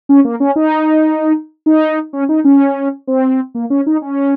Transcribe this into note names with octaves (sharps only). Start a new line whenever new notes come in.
C#4
A#3
C#4
D#4
D#4
C#4
D#4
C#4
C4
A#3
C#4
D#4
C#4